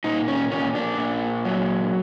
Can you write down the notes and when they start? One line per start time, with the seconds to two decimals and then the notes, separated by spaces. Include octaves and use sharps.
0.04 A#2 D#4
0.28 C#4
0.51 A#2 C#4
0.75 D4
0.98 A#2
1.45 F#3